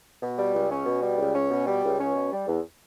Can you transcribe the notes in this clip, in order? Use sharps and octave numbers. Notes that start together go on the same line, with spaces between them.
B2
G3
C#2
C#4
B2
G3
C#2
C#4
B2
G3
C#2
C#4
B2
G3
E2